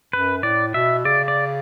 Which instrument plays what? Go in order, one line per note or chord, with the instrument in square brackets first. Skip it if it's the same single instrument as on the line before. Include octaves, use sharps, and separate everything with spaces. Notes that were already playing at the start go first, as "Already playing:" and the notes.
[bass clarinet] F#2 [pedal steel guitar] B4
[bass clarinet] A2 [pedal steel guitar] D5
[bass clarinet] B2 [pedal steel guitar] E5
[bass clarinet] C#3 [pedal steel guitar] D5
[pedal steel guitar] D5